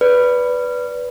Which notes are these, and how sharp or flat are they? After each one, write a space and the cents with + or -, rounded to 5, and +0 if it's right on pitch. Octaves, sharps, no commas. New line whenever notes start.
B4 +0 D5 -20